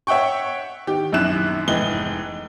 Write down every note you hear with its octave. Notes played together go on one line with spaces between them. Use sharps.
C#5 E5 F#5 G5 C#6
D#3 G4
A#1 F#2 D#3 E4 F#6 E7
F1 G#2 E3 D#5 G7